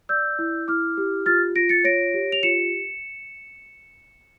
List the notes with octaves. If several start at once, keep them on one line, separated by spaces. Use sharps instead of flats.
D5 E6 G6
E4
E4 D6 F6
G4
F4 F6 A6
F4 A#6 D7
A6 C#7
C#5 A#6 D7
G4
F7
F4 C#7 E7